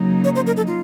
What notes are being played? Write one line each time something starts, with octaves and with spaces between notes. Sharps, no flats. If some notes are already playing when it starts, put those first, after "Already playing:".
Already playing: C#3 F#3 A#3 D#4
C#5
C5
A#4
A4
F4